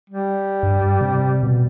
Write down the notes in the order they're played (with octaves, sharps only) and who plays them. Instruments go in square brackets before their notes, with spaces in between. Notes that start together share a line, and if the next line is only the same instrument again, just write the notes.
[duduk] G3
[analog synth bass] G2
C3
B2